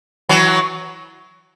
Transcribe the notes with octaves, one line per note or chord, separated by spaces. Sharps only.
E3 F#3